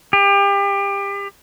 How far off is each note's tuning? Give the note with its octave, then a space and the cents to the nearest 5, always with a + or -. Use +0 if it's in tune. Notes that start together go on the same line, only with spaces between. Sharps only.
G4 +30